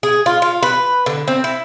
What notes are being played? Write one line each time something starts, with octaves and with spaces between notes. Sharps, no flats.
G#4
F4
F4
B4
D3
C4
E4